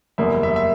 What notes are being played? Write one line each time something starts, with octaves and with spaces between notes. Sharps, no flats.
F#1 E2 C#3 G3 A#3 E5
E5
E5